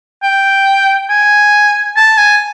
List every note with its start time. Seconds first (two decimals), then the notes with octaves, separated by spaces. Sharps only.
0.23 G5
1.10 G#5
1.97 A5
2.18 G#5